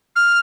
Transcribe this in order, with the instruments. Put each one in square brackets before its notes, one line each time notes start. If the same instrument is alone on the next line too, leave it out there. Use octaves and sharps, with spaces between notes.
[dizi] F6